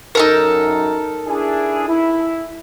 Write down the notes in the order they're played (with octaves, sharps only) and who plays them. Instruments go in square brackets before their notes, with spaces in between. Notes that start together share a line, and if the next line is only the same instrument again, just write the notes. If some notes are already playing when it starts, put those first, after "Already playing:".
[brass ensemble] F#2 [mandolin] D#4 A4 A#4
[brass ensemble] D4 E4 G#4
E4